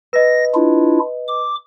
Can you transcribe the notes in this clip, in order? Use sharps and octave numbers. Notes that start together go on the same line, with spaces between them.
B4 D#5 A#6
D4 E4 F4
D6